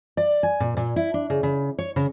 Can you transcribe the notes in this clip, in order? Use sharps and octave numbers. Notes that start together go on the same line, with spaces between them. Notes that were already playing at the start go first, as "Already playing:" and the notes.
D5
G#5
A#2
A#2
E4
D4
C#3
C#3
C#5
C#3